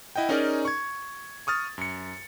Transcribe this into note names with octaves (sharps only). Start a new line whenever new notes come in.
E4 D#5 F#5 G5
C#4 D#4 G#4 A#4 D5
C#6 G#6
C#6 D#6 F6 A6
F#2 C#7